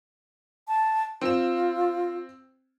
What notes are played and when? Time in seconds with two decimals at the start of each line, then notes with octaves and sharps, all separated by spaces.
0.68 A5
1.22 C4 F4 E7